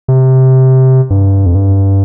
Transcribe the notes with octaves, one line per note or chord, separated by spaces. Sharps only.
C3
G2
F2
G2